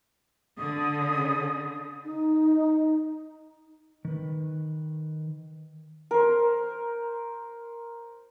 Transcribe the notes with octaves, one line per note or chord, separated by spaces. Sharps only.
D3 D#6
D#4
D#3 B4
A#4 C5